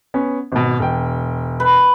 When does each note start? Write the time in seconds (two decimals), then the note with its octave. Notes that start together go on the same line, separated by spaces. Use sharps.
0.14 B3 C#4
0.52 G#1 B2
0.79 E1 G5
1.60 B4